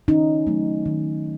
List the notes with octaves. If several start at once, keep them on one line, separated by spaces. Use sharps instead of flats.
D#3 C#4 D#4
F#3 A3
D#3